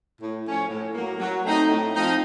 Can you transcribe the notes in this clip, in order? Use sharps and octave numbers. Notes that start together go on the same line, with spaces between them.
A2
F3 A3 C#4
A2
F#3 A#3
F#3
A3 C4 D#4
A2
F3 C4 D#4